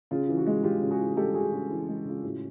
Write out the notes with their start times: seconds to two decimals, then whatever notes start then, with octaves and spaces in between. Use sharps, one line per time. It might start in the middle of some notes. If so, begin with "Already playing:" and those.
0.11 C#3 F4
0.29 E3
0.37 F#4
0.46 G#3
0.64 C#3 F4 G4
0.81 C#3
0.91 F#4 G#4
1.00 E3
1.16 G#3 G4 A4
1.34 C#3 F#4 G#4
1.52 C#3 F#4
1.70 E3
1.88 G#3
2.05 C#3 F4
2.24 A2 F#4